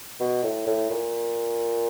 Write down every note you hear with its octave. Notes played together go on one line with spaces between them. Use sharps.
B2
A2
A2
A#2